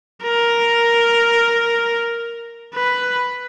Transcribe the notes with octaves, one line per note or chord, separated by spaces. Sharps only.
A#4
B4